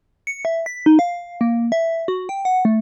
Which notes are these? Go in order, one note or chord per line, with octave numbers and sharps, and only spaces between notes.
C#7
E5
B6
D#4
F5
A#3
E5
F#4
G5
F#5
A3